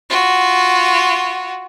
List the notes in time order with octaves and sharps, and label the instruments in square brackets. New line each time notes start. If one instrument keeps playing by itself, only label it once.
[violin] F4 F#4